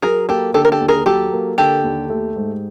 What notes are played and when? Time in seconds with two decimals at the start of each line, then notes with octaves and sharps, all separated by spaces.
0.02 F#3 G#4 A#4
0.28 A#3 G4 A4
0.54 D3 G4 A4
0.65 A#4
0.72 G4 A4
0.81 D#2
0.88 G#4 A#4
1.06 F#3 G4 A4
1.32 A#3
1.58 D3 G4 A4
1.84 D#2
2.10 A3
2.36 G#2